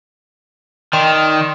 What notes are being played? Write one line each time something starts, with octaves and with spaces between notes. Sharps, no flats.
D#3 D5 G5 C6